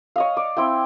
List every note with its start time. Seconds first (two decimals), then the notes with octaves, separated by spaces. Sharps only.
0.16 C#5 D#5 F5
0.37 D5
0.57 C4 E4 G5